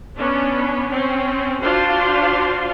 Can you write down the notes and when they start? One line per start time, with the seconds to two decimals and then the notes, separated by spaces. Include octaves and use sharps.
0.16 B3 C#4 D4
0.91 C4 C#4
1.63 D4 F4 F#4 C5 F5 C6